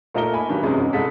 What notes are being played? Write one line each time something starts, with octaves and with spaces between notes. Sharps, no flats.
A#2 A3 D#4 A#4 D#5 G7
G#5 B5
G2 D#3 F#3
F#2 C3 E3 G#3 C#4
G#2
C2 G#3 D#4 A4 B6